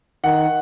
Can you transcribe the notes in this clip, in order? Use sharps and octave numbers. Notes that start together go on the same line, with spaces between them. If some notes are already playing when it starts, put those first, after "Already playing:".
D#3 F#5